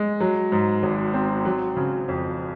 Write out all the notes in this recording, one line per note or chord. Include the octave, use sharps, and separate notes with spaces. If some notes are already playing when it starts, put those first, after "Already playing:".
Already playing: G#3
F#3
G#2
G#1
C4
F#3
C#3
F2